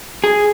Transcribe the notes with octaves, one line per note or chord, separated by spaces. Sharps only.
G#4